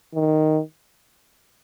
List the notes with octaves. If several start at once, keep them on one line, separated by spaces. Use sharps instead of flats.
D#3